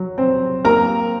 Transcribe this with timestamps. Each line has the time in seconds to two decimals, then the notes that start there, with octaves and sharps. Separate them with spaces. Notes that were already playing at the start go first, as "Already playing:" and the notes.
Already playing: F#3
0.18 C4
0.65 A#3 A#4 A#5